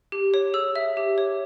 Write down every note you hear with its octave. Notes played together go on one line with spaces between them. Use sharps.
G4
C#5
G#4 E6
E5
G4
C#5